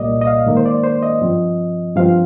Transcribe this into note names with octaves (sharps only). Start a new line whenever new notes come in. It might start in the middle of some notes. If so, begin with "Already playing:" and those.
Already playing: C2 A#2 G3 A#3 D5 D#5
D#5
F5
G#2 D#3 A#3
C5
D5
C5
D#5
G2 F3 C4
G2 F3 C4 F5